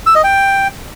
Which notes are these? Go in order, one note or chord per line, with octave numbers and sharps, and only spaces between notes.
E6
D#5
G5